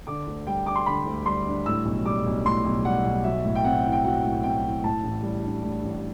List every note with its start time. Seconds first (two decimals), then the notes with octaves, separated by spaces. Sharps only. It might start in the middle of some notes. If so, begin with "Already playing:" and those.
0.07 D3 D6
0.27 D2
0.47 G3 G5
0.66 D4 D6
0.76 C6
0.86 D3 B5
1.06 D2
1.25 G3 C6
1.46 D4
1.66 A2 E6
1.85 B1
2.05 G3 D6
2.26 B1
2.45 A2 C6
2.65 B1
2.85 G3 F#5
3.05 B1
3.24 F#3 E5
3.45 A2
3.56 G5
3.64 C4 F#5
3.84 E4
3.92 G5
4.04 F#3 F#5
4.24 A2
4.43 C4 G5
4.64 E4
4.83 A2 A5
5.04 A1
5.23 G3
5.42 D4
5.63 A2
5.83 A1